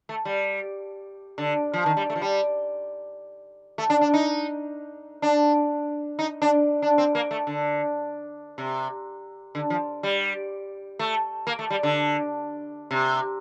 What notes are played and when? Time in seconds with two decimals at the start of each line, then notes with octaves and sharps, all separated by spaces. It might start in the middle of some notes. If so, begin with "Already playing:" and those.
0.09 A3
0.25 G3
1.38 D3
1.73 F3
1.86 D#3
1.97 G3
2.10 A3
2.16 F3
2.22 G3
3.78 A3
3.90 D4
4.01 D4
4.14 D#4
5.22 D4
6.19 D#4
6.42 D4
6.82 D4
6.98 C4
7.15 A#3
7.31 A3
7.47 D3
8.58 C3
9.55 D3
9.70 F3
10.03 G3
10.99 A3
11.47 A#3
11.59 A3
11.70 G3
11.83 D3
12.91 C3